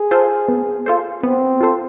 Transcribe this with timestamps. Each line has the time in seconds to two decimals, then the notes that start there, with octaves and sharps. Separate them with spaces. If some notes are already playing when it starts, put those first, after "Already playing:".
Already playing: G#4
0.11 F4 A4 C5
0.48 B3
0.86 F4 A4 C5
1.23 B3 C4
1.61 F4 A4 C5